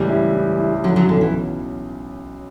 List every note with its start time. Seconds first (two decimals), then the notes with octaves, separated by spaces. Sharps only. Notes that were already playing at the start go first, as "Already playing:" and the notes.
Already playing: C#2 A2 E3 G3
0.10 E4
0.34 E4
0.59 E4
0.84 D3 F#3 C#4
0.96 D3 F#3
1.09 B1 D3
1.21 E3